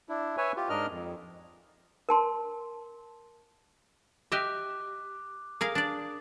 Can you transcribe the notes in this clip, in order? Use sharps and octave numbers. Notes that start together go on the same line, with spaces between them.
D4 E4
B4 C#5 E5 G#5
F4 G4
G#2 D4 A#4 D#5 F6
F2
A#4 A5 C6
G4 D#5 E5 D6 F#6
G#4 A#4 F5 D#6
D4 D5